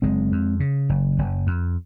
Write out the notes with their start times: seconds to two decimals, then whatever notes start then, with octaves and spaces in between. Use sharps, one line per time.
0.02 F#1 G#3 C4
0.32 F2
0.60 C#3
0.89 F#1
1.18 F#1
1.47 F2